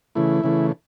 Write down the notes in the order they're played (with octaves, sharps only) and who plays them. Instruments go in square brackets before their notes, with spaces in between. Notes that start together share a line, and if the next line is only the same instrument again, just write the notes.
[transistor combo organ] C#3 E3 A3 E4
C#3 E3 A3